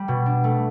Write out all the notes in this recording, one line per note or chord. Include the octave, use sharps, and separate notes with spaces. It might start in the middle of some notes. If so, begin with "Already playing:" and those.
Already playing: G3
B2
D4
A3